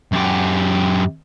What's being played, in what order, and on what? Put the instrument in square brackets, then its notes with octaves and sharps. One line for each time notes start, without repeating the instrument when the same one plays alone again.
[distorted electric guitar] F#2 G4